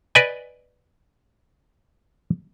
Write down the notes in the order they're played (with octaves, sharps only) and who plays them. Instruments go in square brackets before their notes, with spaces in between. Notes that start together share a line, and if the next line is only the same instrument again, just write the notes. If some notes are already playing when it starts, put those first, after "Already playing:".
[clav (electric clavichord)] B4 D5 D#5 G#5